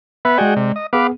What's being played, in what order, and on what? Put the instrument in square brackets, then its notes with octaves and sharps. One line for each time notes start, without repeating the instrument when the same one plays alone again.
[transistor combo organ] B3 B4 [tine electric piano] E5
[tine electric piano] G#3 D5 [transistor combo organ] F#4 G#4 G5
[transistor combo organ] C3
D#5
[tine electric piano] B3 G#4 [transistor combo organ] B4 F5 D6